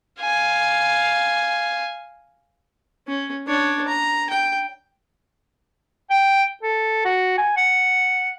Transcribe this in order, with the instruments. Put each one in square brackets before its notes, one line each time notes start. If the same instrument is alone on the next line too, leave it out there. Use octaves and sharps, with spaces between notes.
[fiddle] F5 G#5
[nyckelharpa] C#4
D4 C#5
A#5
G5
[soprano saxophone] G5
A4
F#4
G#5
F#5